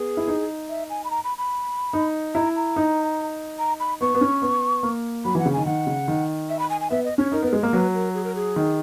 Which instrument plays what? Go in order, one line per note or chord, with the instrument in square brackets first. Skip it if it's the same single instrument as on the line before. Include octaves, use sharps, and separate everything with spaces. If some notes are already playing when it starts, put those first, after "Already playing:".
Already playing: [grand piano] B3 [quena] G#4
[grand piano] E4
D#4
[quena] E5
G#5
B5
A#5
B5
B5
[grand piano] D#4
[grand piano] E4 [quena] A#5
[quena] A#5
[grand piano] D#4
[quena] A#5
B5
[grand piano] B3 [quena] C#6
[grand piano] B3
C#4
B3
A#3
[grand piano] F#3 [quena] B5
[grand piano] E3 [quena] F#5
[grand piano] C#3
[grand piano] D#3 [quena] G#5
[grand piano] D#3 [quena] F#5
[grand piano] C#3
D#3
[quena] E5
B5
G#5
G#5
[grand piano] B3 [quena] E5
[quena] D#5
[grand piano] C#4 [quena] C#5
[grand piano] D#4 [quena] A#4
[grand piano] B3 [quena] A#4
[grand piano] G#3
[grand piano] A#3 [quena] G#4
[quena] A#4
[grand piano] F#3 [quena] B4
[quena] A#4
G#4
A#4
G#4
[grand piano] D#3